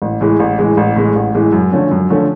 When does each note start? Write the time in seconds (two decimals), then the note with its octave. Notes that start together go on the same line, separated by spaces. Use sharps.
0.02 A1
0.21 A2 E3 G#3
0.40 A1
0.58 A2 E3 G#3
0.77 A1
0.96 A2 E3 G#3
1.16 A1
1.34 A2 E3 G#3
1.53 F#2
1.72 D3 F3 A3 C#4
1.91 F#2
2.10 D3 F3 A3 C#4